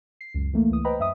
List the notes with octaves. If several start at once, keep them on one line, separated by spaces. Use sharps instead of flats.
C7
C#2 F#2
E3 A3 A#3
C#2 E3 D#6
B4 C5 D#5 G5 A#5 B5
F#2 E5 D#6